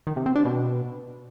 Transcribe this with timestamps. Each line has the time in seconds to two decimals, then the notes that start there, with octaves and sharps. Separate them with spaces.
0.07 D#3
0.16 C3
0.26 C4
0.35 D4
0.45 B2